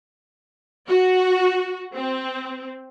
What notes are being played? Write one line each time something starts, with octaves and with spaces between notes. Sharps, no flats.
F#4
C4